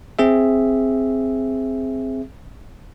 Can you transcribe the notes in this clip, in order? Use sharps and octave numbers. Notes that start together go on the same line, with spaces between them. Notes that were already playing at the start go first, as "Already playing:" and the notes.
C4 G#4 E5